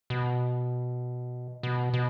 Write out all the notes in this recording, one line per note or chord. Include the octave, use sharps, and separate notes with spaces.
B2
B2
B2